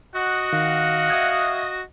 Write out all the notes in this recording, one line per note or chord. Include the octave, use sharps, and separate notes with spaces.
F#4 D#5 F#5
D#3 F5
E5 D#6 G#6